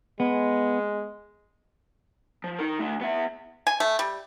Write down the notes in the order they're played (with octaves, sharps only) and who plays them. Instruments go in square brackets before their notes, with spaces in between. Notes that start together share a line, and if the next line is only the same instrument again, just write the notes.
[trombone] G#3 [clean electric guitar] B3
[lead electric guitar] F3
D#4 A#4
A3 D4
B3 E5
[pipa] G#5
A3
G3